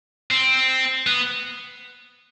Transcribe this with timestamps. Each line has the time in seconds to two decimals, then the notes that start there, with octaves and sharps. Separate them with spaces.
0.31 C4
1.06 B3